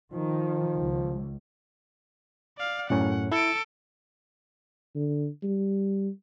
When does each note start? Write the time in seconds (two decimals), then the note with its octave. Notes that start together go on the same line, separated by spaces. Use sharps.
0.13 D#3 F3
0.76 C#2
2.58 D5 F5
2.90 F#2 A2 C#4 F#5
3.32 E4 A4 D7
4.96 D3
5.43 G3